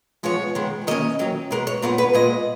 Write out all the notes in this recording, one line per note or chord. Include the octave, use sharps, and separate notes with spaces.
F3 G#3 B3 C#5
D#3 G#3 B3
D#3 A#3 C#4 D#5
D#3 F#3 C#4
B2 G#3 B3 A#4
C#5
A#2 G#3 B3 A#4
B4
A#2 G#3 B3 D#5